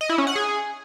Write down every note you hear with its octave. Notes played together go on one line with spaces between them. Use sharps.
D#5
E4
C#4
F#5
G#4